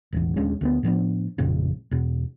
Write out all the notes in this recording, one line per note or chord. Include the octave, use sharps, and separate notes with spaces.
E1 A1 E2
D#1 G#3 C#4 D4
D2 A#3 B3
A2 F3 B3 D4
G#1 F2 A#2 C#3
E2 B2